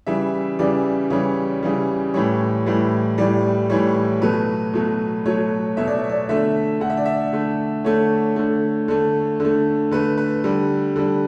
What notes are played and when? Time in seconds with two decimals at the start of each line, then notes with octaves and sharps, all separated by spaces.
0.07 C#3 E3 G3 E5
0.59 C#3 E3 G3 D5
1.10 C#3 E3 G3 C#5
1.63 C#3 E3 G3
2.14 A2 E3 G3 C#5
2.66 A2 E3 G3
3.18 A2 E3 G3 D5
3.70 A2 E3 G3 C#5
4.21 B2 F#3 A3 B4
4.73 B2 F#3 A3
5.26 B2 F#3 A3 C#5
5.77 B2 F#3 A3 E5
5.88 D5
5.99 C#5
6.09 D5
6.29 D3 A3 E5
6.80 D3 A3 F#5
6.90 E5
6.97 D5
7.05 E5
7.33 D3 A3
7.84 D3 A3 C#5
8.36 D3 A3
8.88 D3 A3
9.40 D3
9.45 A3
9.91 D3 A3 B4
10.18 B4
10.44 D3 G3
10.96 D3 G3